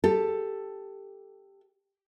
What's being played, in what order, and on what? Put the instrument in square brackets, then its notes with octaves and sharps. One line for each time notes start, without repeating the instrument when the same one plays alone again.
[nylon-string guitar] G4 A4